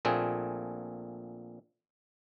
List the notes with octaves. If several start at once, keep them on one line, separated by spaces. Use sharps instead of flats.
A#1 A#2 A3 C4 G#4